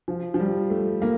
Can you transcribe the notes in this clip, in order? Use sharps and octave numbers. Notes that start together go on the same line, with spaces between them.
F3
F3
G3
A3
A#3